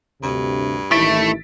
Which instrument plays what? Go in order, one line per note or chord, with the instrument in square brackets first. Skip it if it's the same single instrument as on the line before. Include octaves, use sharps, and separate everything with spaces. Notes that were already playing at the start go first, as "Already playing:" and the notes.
[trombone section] D2 C3 [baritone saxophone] G2
[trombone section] A1 D#3 E4 [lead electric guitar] A3 [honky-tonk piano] A6 B6 D7